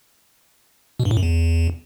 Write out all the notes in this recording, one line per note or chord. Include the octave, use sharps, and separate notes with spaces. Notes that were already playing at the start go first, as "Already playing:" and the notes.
B2
G2
A2
F#2
E2